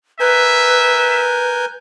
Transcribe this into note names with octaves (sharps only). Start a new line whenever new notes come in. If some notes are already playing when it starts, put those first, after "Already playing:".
A#4 B4 E5 G#5 G6